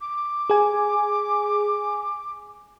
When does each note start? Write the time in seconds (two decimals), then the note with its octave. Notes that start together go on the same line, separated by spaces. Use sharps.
0.01 D6
0.50 G#4 G#5